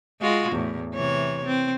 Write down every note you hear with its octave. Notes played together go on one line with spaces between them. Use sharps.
G#3 F4 F#4
E2 A2
C3 E3 C#5
C4